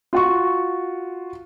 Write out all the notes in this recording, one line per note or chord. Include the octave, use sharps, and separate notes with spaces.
F4 F#4 C#6